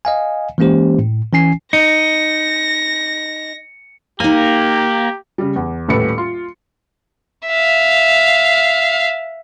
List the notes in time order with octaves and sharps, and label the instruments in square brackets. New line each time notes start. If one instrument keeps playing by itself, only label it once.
[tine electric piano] D#5 F5 G#5
E3 G#3 A#3 C#4 G4 C5
A2
E3 C#4 G#5 C7
[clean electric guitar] D#4 [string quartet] A#6 [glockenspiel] C#7
[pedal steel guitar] A#3 [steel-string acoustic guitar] D#4 G#5 [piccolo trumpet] G4
[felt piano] C#3 G3
E2
D#1 A2 A4 B4 C#7
F4
[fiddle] E5 F5